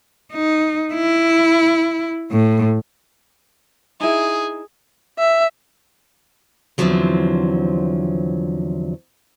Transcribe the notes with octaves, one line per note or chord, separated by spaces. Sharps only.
D#4
E4
A2
D#4 E4 G#4
E5
E2 G#2 D3 F3 F#3 C4